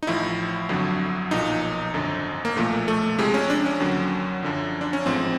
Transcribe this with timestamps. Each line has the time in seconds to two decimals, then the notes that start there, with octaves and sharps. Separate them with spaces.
0.03 D#4
0.07 A1 A2 F3 E4
0.69 G1 F2 D3 F#3
1.31 B1 A#2 F3 D#4
1.94 G#1 F#2 D3
2.45 A#3
2.56 B1 A#2 F3 A3
2.88 A3
3.18 F2 C3 F3 G#3
3.34 C#4
3.50 D4
3.66 C#4
3.80 D#2 D3 F#3
4.43 F#2 D3 F3
4.81 D4
4.93 C#4
5.06 A1 G#2 F3 C4